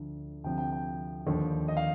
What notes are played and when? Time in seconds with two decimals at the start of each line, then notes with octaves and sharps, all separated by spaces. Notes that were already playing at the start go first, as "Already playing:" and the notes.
Already playing: D2 D3 F3
0.44 D2 C3 F3 G5
0.58 G5
0.72 G5
1.26 D#2 D3 F3
1.68 D#5
1.77 F5